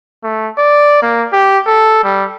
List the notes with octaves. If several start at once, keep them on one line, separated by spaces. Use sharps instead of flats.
A3
D5
A#3
G4
A4
G3